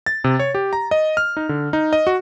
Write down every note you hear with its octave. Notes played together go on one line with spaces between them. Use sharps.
A6
C3
C#5
G4
A#5
D#5
F6
D#4
D3
D#4
D#5
F#4